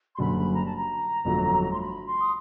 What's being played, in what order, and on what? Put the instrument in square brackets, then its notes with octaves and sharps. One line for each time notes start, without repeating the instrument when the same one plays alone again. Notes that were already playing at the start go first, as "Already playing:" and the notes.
[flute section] C6
[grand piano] F#1 F#2 D3 G3 [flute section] B5
[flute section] B5
A#5
A5
A#5
[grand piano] G1 F2 D3 F#3 A3
[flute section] C6
B5
C6
D#6